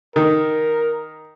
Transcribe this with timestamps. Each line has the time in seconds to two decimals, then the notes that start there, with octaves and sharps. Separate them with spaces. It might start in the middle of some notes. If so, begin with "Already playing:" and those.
0.16 D#3 A#4